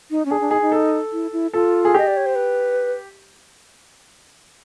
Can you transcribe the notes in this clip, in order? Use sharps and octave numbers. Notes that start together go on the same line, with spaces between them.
D#4
C#4
D4 G#4
D4
D#4 G#4
D#4
A4
E4
E4
F4 A4
G#4
G4 D#5
D5
C#5
C5
B4